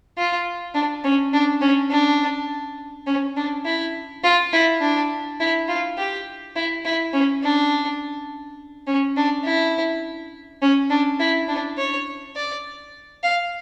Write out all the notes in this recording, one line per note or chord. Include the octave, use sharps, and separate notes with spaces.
F4
D4
C#4
D4
C#4
D4
C#4
D4
E4
F4
E4
D4
E4
F4
G4
E4
E4
C#4
D4
C#4
D4
E4
C#4
D4
E4
D4
C#5
D5
F5